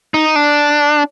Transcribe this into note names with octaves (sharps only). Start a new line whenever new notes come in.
D#4
D4